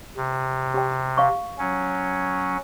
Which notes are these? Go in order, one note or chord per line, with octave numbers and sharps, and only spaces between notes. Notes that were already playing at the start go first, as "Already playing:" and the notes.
C3
G4 G5
F5 C#6
F#3 C#4